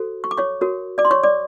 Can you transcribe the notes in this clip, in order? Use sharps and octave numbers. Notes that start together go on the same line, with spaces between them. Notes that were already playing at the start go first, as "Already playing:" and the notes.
Already playing: F#4 A4 C5
C#6
D6
C#5 C#6
F#4 A#4 C#5
D5 D6
C6
C#5 C#6
D5 D6